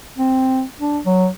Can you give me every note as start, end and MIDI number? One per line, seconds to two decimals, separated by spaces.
0.17 0.63 60
0.80 0.99 62
1.05 1.27 54